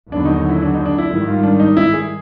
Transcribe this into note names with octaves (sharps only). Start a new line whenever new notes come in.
D#2 D3 F#3 B3 D4
D#4
D#4
E4
D4
D#4
D4
E4
G#2 D#3 G3 E4
F4
D4
D#4
E4
G#4